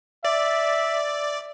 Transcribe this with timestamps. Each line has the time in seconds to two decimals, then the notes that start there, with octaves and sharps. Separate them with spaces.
0.25 D5 E5